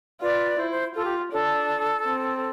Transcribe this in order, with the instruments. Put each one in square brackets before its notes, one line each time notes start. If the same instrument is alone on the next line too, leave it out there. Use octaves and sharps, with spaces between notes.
[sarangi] F4 [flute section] B4 D5
[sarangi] E4 [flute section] C5
[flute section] C5
[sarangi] F4 [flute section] A4
[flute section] G4
[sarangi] D4 [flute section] A4
[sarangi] C4